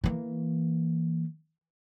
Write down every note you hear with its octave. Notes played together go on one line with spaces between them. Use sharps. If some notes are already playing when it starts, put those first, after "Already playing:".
E3 A#3